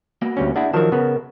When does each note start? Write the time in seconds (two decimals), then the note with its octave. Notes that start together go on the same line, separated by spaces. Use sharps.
0.22 A#3 B3 F#4
0.37 D2 G3 C#4
0.56 D4 E4 G#4 F#5
0.73 D#3 F3 F#3 A#4 A5
0.92 C#3 B3